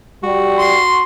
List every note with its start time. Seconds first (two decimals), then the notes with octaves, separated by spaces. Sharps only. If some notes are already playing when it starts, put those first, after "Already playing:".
0.23 G3 F#4
0.58 C6